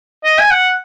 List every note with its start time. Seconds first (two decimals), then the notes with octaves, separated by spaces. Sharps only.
0.24 D#5
0.39 G#5
0.51 F#5